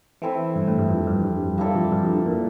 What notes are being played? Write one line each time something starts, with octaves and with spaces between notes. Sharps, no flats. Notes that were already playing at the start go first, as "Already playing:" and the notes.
E3 A3 C4 E4
G2
A2
G2
F2
G2
G2
G2 A#3 E4 A4 D5
F2
G2
F2
G2
A#2